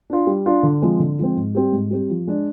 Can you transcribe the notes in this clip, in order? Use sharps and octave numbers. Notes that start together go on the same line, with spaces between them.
D4 F4
G3
D4 F4
D3
F3 G#3 C4
D3
F3 G#3 C4
G#2
G3 C4 G4
G#2
G3 C4 G4
F3
G#3 D4